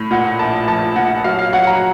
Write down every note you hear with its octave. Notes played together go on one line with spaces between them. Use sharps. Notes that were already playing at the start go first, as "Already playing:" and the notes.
Already playing: A2
A#2 F#5
A#1 A5
F3 A5
A#2 F#5
F#3 F5
F5
F#3 F#5
A#5